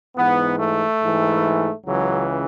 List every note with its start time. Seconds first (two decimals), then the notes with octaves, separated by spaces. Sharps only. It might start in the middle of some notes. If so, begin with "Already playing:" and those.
0.16 G#2 E3 B3
0.59 A3
1.01 G#2 E3
1.85 C#2 C#3 E3 F#3